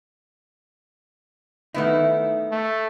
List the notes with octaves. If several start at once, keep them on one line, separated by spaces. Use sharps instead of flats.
D#3 A3 B3 D#4 E4
A3